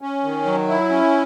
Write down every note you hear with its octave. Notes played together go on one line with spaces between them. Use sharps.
C#4
D#3
F#3
E4
C#4